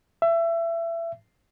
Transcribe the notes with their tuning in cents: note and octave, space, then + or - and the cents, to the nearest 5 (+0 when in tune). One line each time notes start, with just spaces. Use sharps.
E5 +25